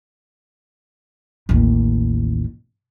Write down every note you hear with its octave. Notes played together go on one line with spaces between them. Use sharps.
A1 D#2